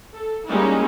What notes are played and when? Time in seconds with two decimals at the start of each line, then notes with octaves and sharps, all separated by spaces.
0.15 A4
0.48 G3 G#3 A#3 C#4 D#4 E4